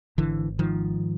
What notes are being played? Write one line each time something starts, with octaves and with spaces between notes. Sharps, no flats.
G#1 D3 E3
G#2 D#3 F3